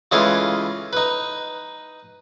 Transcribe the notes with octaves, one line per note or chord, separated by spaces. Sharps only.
C#3 E3 G#3 A3 F4 G#4
D#4 B4